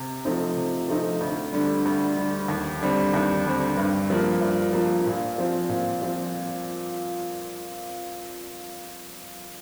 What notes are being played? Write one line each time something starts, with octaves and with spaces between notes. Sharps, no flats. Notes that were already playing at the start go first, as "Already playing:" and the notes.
Already playing: C3
F3 A3 C4 D#4
C3
F3 A3 C4 D#4
D2
D3 G3
D2
D3 G3
D#2
D3 G3 C4
D#2
D3 G3 C4
G2
F3 A#3
G2
F3 A#3
A#2
F3 C4
A#2
F3 C4